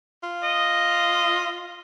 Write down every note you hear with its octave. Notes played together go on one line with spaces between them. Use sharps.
F4
D#5